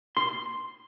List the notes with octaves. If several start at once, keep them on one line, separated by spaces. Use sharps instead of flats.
C6